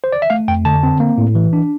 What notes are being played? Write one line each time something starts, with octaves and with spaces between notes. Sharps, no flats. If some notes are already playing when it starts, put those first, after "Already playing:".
C5
D5
E5
A3 F5
F2 G5
D3 A5
C4
A#3
A2
E3
D4